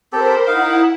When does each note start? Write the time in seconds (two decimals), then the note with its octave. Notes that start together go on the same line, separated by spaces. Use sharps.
0.12 C4 G4 A4 A#4 C5 B5
0.47 D#4 E4 A#4 F5 F#5